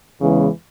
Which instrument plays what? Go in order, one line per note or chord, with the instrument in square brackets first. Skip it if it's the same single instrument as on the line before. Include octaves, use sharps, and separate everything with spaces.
[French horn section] E2 C#3 E3 G#3